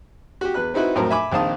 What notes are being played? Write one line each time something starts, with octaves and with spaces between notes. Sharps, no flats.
F#4 G4
E2 B4 F#6
C4 D#4 E4 F#4 B4
F2 A2 F#3 C4 A#4
E5 G#5 B5 D6
A#1 D#3 C4 F5 A5 D#6